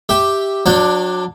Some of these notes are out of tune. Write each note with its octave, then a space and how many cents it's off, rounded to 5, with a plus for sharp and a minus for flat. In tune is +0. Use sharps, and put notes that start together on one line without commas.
G4 +0 E5 -5
F#3 -25 D4 +10 G5 +0